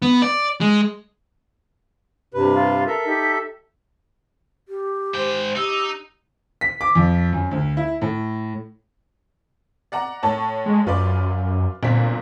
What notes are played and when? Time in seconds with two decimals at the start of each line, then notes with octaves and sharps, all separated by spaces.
0.02 B3
0.22 D5
0.61 G#3
2.34 G2 C3 B4
2.54 F4
2.87 A4 A#4 E5
3.05 D#4 G4
4.68 G4
5.14 G#2 C5 G5
5.56 D#4 G4 E6
6.61 B6
6.81 D6
6.95 F2
7.33 F#2
7.51 D2
7.77 E4
8.02 A2
9.92 D5 F#5 A#5
10.23 A2 C#5 A5
10.66 G#3
10.87 F#2 F4 B4 D5
11.83 G1 A#2 C4 B6